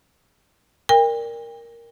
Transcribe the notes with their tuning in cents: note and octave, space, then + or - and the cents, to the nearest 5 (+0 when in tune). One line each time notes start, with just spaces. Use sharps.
A#4 +0 D5 +0 G5 +40